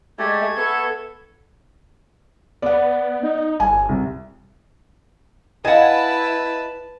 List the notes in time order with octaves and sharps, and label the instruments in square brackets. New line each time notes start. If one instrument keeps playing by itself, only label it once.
[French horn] G#3 [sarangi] A3 [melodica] G4 D5 [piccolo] G#6
[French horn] B3 [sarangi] A4 [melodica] E5 C#6
[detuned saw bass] B3 [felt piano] D5 F#5
[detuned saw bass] D#4
[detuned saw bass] G1 [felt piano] G#5
[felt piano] C2
[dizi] E4 [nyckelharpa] B4 A5 [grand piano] D#5 F5 [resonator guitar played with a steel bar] F#5 G#5